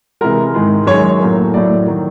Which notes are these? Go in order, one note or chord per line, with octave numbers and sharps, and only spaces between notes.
C3 E3 G#3 A#4
G#2 D#3 G#3
F#2 D#3 G#3 C#5
A2 F#3 A#3
A2 F#3 A3 D5
D#3 F#3